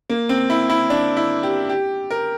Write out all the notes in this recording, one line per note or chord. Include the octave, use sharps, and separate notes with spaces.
A#3
C4
E4
E4
D4
E4
G4
G4
A#4